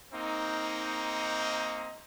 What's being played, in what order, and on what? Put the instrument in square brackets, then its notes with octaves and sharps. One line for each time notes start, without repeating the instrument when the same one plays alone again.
[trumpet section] A#3 C4 D#4